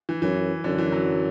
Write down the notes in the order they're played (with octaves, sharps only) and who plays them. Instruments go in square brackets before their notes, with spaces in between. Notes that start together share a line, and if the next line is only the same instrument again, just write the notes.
[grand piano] E3
[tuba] F#2 [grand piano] E3
[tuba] F#2 [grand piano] D3
[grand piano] E3
F#3